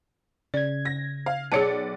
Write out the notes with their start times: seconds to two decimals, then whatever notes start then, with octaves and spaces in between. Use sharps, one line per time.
0.54 C#3 D5 G#6
0.85 A#6
1.26 F5
1.52 B1 G#4 C#5 D5 A5 C#7